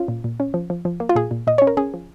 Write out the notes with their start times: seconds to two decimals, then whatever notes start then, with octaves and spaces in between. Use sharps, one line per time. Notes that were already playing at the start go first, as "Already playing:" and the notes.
Already playing: C#4 F4
0.08 A#2
0.24 A#2
0.40 C#4
0.54 F3
0.70 F3
0.85 F3
1.00 A#3
1.09 F4
1.16 A#2 G#4
1.31 A#2
1.47 A#2 D#5
1.58 C#4 C#5
1.67 A#4
1.77 C#4 G#4
1.94 F3